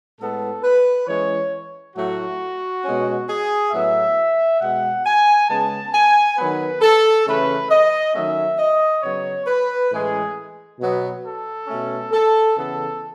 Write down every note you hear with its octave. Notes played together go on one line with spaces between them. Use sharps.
A2 G#3 B3 A4
B4
E3 G#3 C#4 C#5
A2 F#3 A3 F#4
B2 G#3 C#4
G#4
A2 F#3 B3 E5
B2 G#3 B3 F#5
G#5
C#3 G#3 B3 A5
G#5
D#3 F#3 B3 B4
A4
C#3 E3 A3 C#4 B4
D#5
D#3 F#3 A3 C#4 E5
D#5
C#3 F#3 B3 C#5
B4
A2 E3 G#3 C#4 G#4
B2 F#3 B3
A4
B2 A3 C#4
A4
C#3 E3 B3 A4